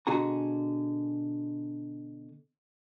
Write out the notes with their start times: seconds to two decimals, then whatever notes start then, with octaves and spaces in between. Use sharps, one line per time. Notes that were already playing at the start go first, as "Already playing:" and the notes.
0.07 B2 D3 F#4 G#4 A#5